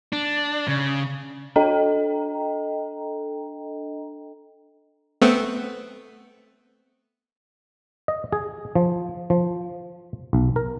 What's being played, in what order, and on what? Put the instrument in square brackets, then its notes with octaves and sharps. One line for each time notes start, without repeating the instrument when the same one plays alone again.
[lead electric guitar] D4
C#3
[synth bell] D4 A4 D#5 G5 A#5
[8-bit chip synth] A3 B3 C4
[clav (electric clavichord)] D#5
G#4
F3
F3
B1
A#4